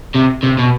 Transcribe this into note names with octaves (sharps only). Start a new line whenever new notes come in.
C3
C3
B2